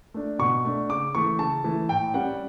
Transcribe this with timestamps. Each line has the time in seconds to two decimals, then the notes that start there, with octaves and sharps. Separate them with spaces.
0.14 A3 D4
0.39 B2 C#6
0.65 A3 D4
0.89 C#3 D6
1.15 E3 A3 C#6
1.39 C#3 A5
1.64 E3 A3
1.89 A2 G5
2.14 G3 C#4 F#5